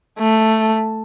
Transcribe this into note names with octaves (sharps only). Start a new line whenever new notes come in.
A3